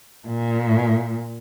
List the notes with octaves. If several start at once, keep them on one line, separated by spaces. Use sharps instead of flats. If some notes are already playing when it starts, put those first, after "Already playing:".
A#2